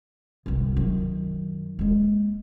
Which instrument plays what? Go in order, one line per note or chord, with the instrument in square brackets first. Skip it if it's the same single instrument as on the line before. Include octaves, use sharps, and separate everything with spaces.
[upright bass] G1 C2
F#2 D#3
G#3 A#3